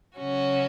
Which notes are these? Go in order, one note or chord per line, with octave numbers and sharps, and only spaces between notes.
C#3 F#3 C#4 F#4